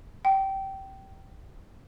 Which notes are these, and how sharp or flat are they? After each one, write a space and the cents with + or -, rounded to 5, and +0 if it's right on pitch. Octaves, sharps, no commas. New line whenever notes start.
G5 -20